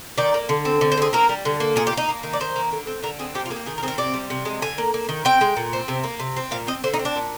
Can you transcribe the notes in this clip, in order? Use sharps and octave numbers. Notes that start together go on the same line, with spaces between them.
D#3 D5
A#3
D3
C4
D3
C5
C4 G#4
A#3 A#4
G3
D3
A#3
A#2 G#4
G4
A#3 D#4
A#3
D#3
D5
D#3 C5
A#3
D3
C4
D3 A#4
C4 G#4
C3 G4
F4
A#3 G#4
G4
D#3 G#4
A#4
C4 G#4
A#4
C3 D5
G3
C3
G#3
D3 G#5
A#3
A#3
D#3
C4 G5
G#3
A#2
C4
C3
A#3
C3
C4
A#2 F5
C4 D#5
D3 C5
D#4
C4
D4
A#2